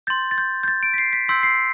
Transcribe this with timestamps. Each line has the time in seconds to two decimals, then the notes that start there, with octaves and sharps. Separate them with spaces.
0.07 C6 G6 A6
0.31 A6
0.38 G6
0.63 G6
0.68 A6
0.83 D7
0.94 B6
0.98 C7
1.13 B6
1.28 C6 E6 G6 B6
1.43 C7